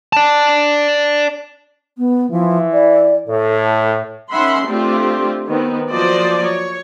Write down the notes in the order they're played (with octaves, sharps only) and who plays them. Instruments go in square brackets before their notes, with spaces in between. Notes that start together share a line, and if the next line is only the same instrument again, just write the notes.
[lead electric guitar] D5 A5
[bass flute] B3
[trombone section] E3 E4 [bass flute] F3
[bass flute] D5
[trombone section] A2 [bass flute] A4
[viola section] D#3 C#4 E5 F#5 B5 C6
A3 C4 D4 F4 G4
D#3 B3 C4
F3 F#3 A#3 C5 D5 D#5
C#5